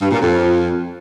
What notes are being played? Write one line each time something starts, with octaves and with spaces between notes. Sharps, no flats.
G2
A#2
F2